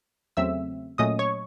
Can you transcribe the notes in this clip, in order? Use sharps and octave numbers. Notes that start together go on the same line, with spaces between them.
E2 C#3 F#3 A3 C4 E5 E6
A#2 F#3 A3 C#4 D#5 D#6
C#5 C#6